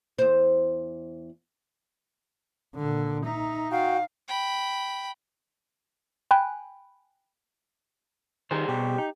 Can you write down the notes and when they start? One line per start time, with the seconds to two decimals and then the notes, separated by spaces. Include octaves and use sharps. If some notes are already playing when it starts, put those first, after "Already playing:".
0.19 E2 C5
2.75 A#2 D3
3.25 D#4 E5 A#5
3.71 F#4 F5 G5
4.28 G5 B5
6.31 G5 G#5 B5 F#6
8.51 D#3 G3 G#4 C5
8.68 B2 G4
8.98 D#4